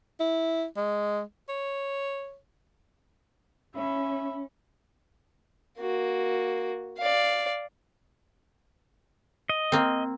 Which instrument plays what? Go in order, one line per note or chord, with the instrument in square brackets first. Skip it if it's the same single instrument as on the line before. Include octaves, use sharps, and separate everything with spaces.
[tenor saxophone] E4
G#3
C#5
[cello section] C#4 [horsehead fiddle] E5 B5
[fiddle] A#3 F#4
D5 F5
[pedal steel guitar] D#5
[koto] A#3 C4